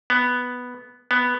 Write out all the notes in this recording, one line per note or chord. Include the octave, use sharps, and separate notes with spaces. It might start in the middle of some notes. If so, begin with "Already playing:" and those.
B3
B3